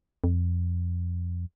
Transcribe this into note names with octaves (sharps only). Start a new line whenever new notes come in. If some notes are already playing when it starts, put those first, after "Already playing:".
F2